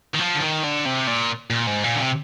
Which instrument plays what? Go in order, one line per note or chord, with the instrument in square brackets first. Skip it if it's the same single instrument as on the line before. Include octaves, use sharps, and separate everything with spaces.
[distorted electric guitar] D#3
F3
D3
D#3
D3
C3
A#2
A#2
G#2
A#2
D3
C3